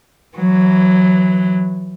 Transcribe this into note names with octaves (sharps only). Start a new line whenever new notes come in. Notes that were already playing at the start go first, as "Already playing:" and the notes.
E3 F#3